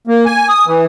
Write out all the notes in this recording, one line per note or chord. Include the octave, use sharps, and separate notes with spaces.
A#3
G#5
D#6
E3